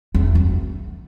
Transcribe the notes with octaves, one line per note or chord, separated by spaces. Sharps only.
E2
F#2